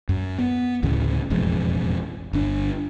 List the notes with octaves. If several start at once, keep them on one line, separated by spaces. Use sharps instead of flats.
F#2
B3
A1 D2 A2 C#3
E1 A1 F2 G#3
G1 D4